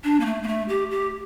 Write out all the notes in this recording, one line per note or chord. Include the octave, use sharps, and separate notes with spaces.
D4
A#3
A3
A#3
A3
G4
G4